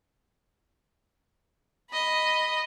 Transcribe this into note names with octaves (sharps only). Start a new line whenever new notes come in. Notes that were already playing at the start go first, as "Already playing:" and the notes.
D#5 B5